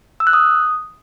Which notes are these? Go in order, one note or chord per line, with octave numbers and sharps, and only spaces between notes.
E6
F#6
D#6